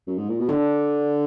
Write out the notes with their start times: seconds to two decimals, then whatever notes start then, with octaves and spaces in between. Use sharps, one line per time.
0.07 F#2
0.17 G#2
0.28 A#2
0.39 B2
0.49 D3 D4